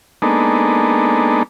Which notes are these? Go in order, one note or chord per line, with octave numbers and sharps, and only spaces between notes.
G#3 A#3 B3 D4 D#4 A4